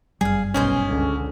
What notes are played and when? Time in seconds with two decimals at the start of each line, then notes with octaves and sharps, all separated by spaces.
0.21 G1 F#2 G3 G#4 F5
0.54 B1 C#4 C5 D#5 G#5
0.86 C#2 D3